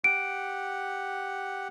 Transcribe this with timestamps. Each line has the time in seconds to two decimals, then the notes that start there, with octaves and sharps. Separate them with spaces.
0.04 G4 F#5 D7